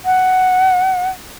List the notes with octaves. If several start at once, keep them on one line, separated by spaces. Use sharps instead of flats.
F#5